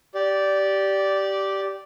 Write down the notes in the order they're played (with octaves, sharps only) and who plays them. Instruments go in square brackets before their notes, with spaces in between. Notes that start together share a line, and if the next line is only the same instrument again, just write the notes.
[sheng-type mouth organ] G4 D5